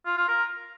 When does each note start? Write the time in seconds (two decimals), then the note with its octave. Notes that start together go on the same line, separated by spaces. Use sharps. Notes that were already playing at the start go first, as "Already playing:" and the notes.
0.06 F4
0.17 F4
0.28 A#4